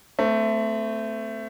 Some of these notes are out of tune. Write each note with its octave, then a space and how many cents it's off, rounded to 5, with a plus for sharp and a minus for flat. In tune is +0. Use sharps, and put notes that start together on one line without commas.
A3 +10 C4 -25